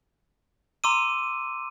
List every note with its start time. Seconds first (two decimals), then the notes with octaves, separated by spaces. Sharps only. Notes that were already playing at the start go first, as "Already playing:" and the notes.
0.84 A#5 C6 D6 E6 D#7